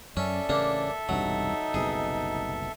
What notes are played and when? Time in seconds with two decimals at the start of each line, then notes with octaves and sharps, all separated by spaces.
0.17 F#2 C#4 A4 D5 E5
0.49 A1 C#3 A#3 C#4 D4
1.09 E1 C2 G2 F#3 D#4
1.74 F#1 C2 B2 G#4